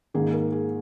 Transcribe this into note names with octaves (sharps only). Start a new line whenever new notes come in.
G#2 D#3 A#3 G#4
A#4
G#4